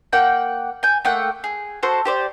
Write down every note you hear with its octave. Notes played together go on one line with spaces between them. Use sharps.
A#3 F#5 G5 G6
G#5 G6
A3 A#3 F#5 G5
G#4
F#4 A4 C5
G4 C5 D5